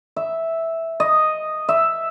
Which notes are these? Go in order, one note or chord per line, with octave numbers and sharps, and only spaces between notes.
E5
D#5
E5